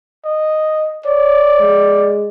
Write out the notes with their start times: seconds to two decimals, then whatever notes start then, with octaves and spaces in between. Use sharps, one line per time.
0.25 D#5
1.06 C#5 D5
1.60 G#3